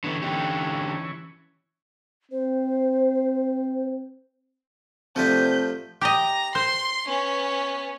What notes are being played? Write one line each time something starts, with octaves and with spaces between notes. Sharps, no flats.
D3 E3 B3 C#4
D3 D#4 G4
C4 C5
C3 F3 A3 C4 D4 A5 G6 B6
G4 D#5 A#5
C5 C6
B3 C#4